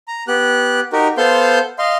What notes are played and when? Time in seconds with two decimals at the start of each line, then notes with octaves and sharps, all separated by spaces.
0.08 A#5
0.28 B3 G4 F#6
0.93 D#4 F#4 G4 A#4
1.18 B3 A4 C5 F5 C6 G6
1.79 D#5 F5 C6